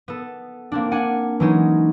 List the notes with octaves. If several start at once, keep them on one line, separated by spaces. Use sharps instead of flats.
B3 A4
A#3 C4 D4
D4 F#5 G#5
E3 F#3 G#3 C#4 D#4